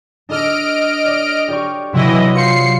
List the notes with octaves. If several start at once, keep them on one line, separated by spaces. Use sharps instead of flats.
D4 A4 D#5 F6 D7
D5
G4 D5 C#6
C3 E3 F#3 E4 D#5
F4 C5 C7 C#7